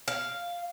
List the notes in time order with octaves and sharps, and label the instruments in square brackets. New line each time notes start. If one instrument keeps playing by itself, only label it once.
[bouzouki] F5